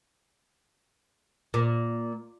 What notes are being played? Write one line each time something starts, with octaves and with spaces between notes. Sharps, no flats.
A#2